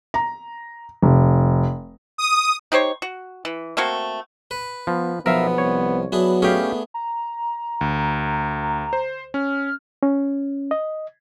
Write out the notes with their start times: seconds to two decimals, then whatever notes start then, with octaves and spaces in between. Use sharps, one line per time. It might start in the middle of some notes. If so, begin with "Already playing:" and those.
0.14 A#5
1.03 F1
2.18 D#6
2.72 D#4 G4 C5 C#5
3.02 F#4
3.45 E3
3.77 A3 A#3 C4 F#4
4.51 B4
4.87 F3 B3
5.26 B1 F3 B3 A#4 E5 F5
5.58 C2 C#5
6.12 F#3 B3 D4 E4 G#4
6.42 A3 C#4 D4 G4 G#4 F5
6.94 A#5
7.81 D2
8.93 C5
9.34 C#4 F6
10.03 C#4
10.71 D#5